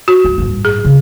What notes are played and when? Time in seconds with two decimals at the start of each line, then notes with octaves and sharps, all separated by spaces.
0.08 F#4
0.25 G2
0.38 A1 G2
0.65 G#4
0.85 C#3 E4